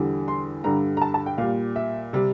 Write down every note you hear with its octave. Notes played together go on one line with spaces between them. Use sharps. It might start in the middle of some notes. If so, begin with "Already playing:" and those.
Already playing: E2 D3 G3
C6
G2 D3 G3 A#5
A#5
A5
A5
G5
A#2 G3 F5
E5
C3 G3